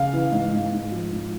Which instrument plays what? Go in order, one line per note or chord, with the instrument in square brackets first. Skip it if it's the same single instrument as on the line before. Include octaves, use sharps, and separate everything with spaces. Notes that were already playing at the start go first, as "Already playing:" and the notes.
Already playing: [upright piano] C#3 F5
E3
G#2
G#2
G#2
F3
G#2